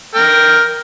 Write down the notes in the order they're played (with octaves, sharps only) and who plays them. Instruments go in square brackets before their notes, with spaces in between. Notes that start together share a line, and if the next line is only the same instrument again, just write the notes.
[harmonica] A#4 G5